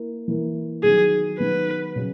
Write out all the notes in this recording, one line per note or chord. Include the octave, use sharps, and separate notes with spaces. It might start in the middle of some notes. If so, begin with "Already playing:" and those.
Already playing: A#3 E4 A#4
E3 A#3 E4 A#4
D#3 F#3 B3 D#4 G#4
D#3 F#3 B3 D#4 B4
C#3 F#3 C#4